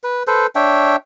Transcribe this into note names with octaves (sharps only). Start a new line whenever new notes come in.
B4
A4 B4 C5
D4 C#5 E5 G5